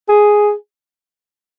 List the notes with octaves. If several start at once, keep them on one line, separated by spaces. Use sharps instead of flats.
G#4